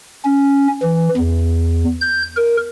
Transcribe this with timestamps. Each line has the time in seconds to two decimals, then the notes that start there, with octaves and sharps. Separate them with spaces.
0.25 C#4
0.83 E3
1.17 E2
2.01 G6
2.37 A#4